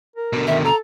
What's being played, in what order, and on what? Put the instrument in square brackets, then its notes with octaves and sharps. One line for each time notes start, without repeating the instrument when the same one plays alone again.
[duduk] A#4
[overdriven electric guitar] B2 D3
[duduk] D#3 [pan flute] E5
[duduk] A4 [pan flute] A#5